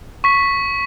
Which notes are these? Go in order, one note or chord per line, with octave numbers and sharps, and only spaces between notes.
C#6 B6